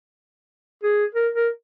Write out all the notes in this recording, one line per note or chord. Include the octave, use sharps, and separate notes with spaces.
G#4
A#4
A#4